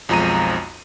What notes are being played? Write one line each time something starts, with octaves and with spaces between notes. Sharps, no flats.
B1 F2 F3 G#3 A#5 D#7